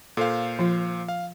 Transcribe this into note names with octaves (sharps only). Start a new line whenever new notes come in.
A#2 A4 C5 F5
F3 F4
F5